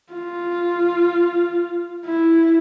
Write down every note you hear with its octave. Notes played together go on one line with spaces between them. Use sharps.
F4
E4